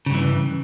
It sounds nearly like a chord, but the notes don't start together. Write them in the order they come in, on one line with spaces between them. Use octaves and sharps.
C#3 G2 E3